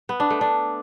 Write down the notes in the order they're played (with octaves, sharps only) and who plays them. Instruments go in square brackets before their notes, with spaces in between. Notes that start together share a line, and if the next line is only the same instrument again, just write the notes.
[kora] B3
D4
A3
D4